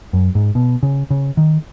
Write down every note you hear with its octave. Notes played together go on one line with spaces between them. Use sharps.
F#2
G#2
B2
C#3
C#3
D#3